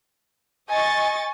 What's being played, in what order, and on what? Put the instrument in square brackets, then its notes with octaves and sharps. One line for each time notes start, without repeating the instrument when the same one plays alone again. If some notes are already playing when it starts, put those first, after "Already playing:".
[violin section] D#5 C#6 A6 [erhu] G#5